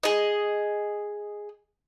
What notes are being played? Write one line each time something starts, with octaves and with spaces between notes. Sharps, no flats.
G#4 D#5